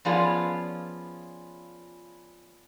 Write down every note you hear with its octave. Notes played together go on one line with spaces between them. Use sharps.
F3 B3 C#4 F4 G#4 D5